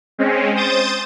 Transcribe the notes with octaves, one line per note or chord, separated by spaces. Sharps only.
G#3 C4 C#4
C5 D#6 G6 A6